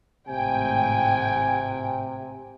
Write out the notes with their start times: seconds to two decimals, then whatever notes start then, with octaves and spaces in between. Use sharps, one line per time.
0.29 G#1 A2 C3 G5 G#5